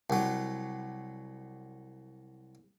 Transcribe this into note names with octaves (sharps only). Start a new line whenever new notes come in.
C2 F#3